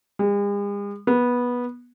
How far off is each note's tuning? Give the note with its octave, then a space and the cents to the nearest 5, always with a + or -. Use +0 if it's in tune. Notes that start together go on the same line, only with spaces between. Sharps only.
G#3 -45
B3 -15